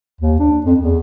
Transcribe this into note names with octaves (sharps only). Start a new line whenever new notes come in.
D#2
D4
F2
E2